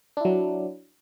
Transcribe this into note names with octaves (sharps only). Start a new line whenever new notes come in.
F#3 D4 E4